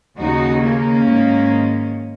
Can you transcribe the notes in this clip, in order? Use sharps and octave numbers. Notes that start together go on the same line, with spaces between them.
D#2 C#3 D#4 F#4
A#3 C#4
G#2 D#3